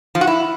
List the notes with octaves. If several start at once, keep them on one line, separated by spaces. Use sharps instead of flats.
F3
F#4
E4